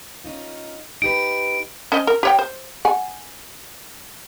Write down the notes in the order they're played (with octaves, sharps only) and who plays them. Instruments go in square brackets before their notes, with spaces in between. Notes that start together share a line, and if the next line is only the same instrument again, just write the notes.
[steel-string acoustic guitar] C#4 D#4 F4
[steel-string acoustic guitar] D#4 G4 B4 [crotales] D7
[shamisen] C#4 C5 D#5
A#4
G4 C#5 G5
C5
F#5 G#5